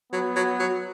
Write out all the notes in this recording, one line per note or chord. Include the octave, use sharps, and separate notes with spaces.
F#3 B3
F#3
F#3